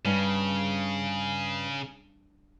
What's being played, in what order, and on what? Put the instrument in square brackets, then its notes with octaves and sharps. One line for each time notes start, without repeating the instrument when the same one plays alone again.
[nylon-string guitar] G2 [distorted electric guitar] C#3